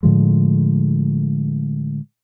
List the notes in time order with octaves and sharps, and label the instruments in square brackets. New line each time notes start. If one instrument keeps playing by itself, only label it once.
[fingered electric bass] A2 D3 F3 G#3